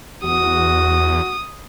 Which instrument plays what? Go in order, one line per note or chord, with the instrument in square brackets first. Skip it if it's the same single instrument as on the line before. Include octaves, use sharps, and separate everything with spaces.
[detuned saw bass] E2 [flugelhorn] F#4 [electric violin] D#6